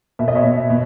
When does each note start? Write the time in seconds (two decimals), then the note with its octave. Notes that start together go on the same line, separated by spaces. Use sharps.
0.19 B2 E5
0.28 D#5
0.35 C#5 E5
0.44 B2
0.70 B2